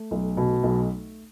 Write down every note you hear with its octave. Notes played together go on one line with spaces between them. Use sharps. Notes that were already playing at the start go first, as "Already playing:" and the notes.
Already playing: A3
B1
B2
B1